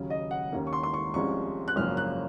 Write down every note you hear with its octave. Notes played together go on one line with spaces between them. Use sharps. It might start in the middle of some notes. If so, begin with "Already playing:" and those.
Already playing: D#2 C#3 F#3 C#4
D#5
F#5
D#2 D#3 A#3 C#4
C#6
C6
C6
C#6
C2 C3 F3 G#3 C#4 C#6
F#6
G#1 F#2 C#3 F3 A#3 F6
F#6